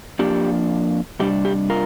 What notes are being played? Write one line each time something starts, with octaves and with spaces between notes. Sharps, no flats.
F2 F3 A#3 D4 G4
C3 G3 D4 G4
G4
F4 A#4